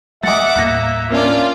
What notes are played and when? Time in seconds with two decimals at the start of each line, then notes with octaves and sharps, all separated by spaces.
0.23 G3 G#3 D#5 E5 F#5 D6 A6
0.56 D#2 A2 A#3 F#6 A#6
1.10 A#3 C#4 D4 F4 D5